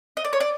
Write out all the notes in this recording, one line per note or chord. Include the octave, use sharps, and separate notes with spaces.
D#5
D5
C#5
D5